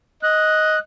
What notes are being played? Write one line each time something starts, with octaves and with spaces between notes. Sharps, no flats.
D#5 F#6